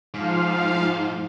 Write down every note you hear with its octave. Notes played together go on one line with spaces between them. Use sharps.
G#2 F3 F5